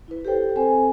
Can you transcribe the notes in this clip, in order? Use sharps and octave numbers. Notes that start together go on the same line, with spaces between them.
E4 B4
G4 A4 C5 G5
C4 A4 C5 G#5